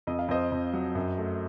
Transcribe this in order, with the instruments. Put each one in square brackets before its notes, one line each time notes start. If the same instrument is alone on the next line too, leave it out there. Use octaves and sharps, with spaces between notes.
[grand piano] F2 D#5
F5
F2 C5 D#5
F2
F#3
F#2
A3